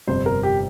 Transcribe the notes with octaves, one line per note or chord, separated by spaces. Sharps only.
G1 F2 C3 G3 C4 C5
A#4
G4